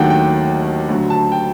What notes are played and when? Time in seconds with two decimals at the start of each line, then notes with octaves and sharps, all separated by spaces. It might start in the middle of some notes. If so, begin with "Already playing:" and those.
Already playing: D#2 D#3 F#3 A3 D4 F#5 G5
0.10 G5
0.89 D2 D3 F#3
1.10 A5
1.32 G5